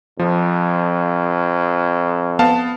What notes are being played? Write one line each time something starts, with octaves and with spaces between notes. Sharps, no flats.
F2 F3
B3 F5 A5